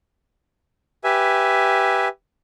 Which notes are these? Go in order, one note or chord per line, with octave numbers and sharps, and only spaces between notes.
G4 B4 E5 G#5